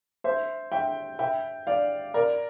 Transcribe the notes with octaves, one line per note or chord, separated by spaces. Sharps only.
C5 E5
E5 G5
E5 G5
D5 F5
A#4 D5